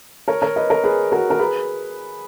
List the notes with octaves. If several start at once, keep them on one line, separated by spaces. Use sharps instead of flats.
A#4 C#5
A#4 C#5
B4 D#5
A#4 C#5
G#4 B4
F#4 A#4
A#4
G#4 B4